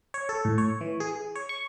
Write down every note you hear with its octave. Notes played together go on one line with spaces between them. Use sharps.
C#5
A4
A2
C#5
E3
G#4
G#4
C#5
C#6